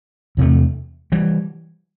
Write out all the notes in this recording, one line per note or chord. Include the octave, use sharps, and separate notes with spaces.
E2 C3 A3
E3 G3